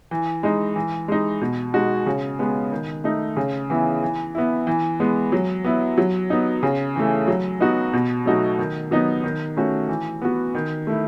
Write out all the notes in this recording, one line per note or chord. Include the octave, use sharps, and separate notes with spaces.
E3
G#3 D#4
E3
G#3 D#4
B2
G#3 D#4 F#4
C#3
G#3 B3
D#3
A3 D#4
C#3
E3 B3 E4
E3
B3 E4
E3
G#3 B3
F#3
B3 E4
F#3
B3 D#4
C#3
E3 A3
F#3
B3 D#4 F#4
B2
F#3 A3 D#4 F#4
D#3
F#3 B3 D#4
D#3
A3 C#4 F#4
E3
B3 F#4
D#3
A3 E4